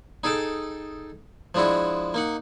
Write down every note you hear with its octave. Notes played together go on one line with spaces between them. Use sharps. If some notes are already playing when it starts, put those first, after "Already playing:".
D#4 G#4 A4 G5 A5
F3 G#3 D4 E4 F#4
A#3 D#4 F#5